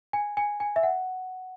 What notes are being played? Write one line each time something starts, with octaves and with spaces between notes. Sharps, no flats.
G#5
G#5
G#5
E5
F#5